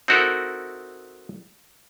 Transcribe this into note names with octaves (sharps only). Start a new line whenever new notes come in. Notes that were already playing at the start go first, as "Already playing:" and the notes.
C4 D#4 E4 F#4 A4 A#4